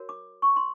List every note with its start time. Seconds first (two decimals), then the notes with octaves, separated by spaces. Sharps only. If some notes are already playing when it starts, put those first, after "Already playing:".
Already playing: F#4 A#4 C#5
0.09 D6
0.42 C#6
0.56 C6